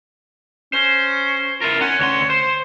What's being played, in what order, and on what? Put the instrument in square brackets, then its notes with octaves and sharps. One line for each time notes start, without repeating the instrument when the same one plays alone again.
[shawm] C#4 [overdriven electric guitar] C5
[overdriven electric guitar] E4 A#4 [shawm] F4
[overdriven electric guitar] C#4 [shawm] F#5
[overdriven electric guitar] D2 C6 [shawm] C#5
[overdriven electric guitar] C5 [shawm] C6